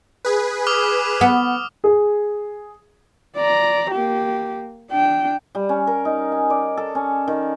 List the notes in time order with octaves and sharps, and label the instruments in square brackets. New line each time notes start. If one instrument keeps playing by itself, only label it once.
[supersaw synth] G#4 B4
[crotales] D6 D#6 F6
[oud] B3
[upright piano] G#4
[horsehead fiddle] D5 A#5
A#3 G4
D4 G5
[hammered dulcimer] G3
C#4
A#4
D#4
G#5
D5
A4
C#4
D#3